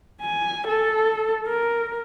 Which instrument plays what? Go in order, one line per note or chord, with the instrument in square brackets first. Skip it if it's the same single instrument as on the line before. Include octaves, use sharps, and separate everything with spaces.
[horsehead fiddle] G#5
A4
A#4